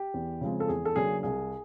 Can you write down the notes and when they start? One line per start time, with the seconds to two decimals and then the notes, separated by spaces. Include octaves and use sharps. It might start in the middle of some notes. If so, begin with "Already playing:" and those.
Already playing: G4
0.14 E2
0.41 C#3 F3 G#3 C4
0.60 A4
0.68 E2 G#4
0.85 A4
0.96 C#3 F#3 A#3 D4 G#4
1.23 C2 G#4